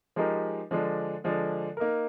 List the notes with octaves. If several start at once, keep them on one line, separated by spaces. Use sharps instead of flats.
F3 G#3 D#4 G4 A#4
D3 F3 G#3 D4
D3 F3 G#3 D4
A#3 D#4 A#4